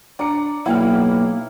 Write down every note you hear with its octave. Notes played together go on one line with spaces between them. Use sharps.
D4 D5 A#5 C#7
B1 A#3 E4 F#5 G5 F6